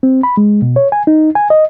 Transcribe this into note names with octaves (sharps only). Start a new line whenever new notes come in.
C4
B5
G#3
B2
C#5
G#5
D#4
G#5
D#5